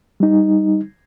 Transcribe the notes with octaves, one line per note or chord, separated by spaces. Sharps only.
G3 D#4